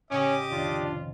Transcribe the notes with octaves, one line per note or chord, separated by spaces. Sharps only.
A1 C#3 G#3 C#4 G4 D#5 D6
F2 C3 D#3 D4 F4